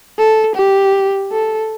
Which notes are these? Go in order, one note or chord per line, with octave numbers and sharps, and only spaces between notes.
A4
G4
A4